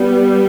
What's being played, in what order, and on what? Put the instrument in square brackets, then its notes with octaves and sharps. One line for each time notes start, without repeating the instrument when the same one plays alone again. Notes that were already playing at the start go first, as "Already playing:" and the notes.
Already playing: [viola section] G3 B3